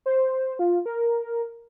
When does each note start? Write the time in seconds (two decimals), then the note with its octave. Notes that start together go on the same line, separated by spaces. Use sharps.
0.06 C5
0.59 F4
0.86 A#4